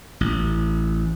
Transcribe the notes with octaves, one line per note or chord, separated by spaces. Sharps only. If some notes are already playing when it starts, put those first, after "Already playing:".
A1